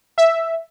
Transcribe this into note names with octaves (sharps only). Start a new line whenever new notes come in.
E5